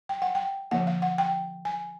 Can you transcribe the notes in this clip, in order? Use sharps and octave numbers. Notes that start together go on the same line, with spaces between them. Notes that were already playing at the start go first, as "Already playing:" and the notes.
G5
F#5
G5
D3 F3 A#3 F#5
F5
F#5
G5
G#5